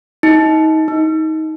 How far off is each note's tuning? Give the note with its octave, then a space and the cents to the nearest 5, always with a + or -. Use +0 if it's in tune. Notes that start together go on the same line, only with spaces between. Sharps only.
D#4 +25
D#4 +20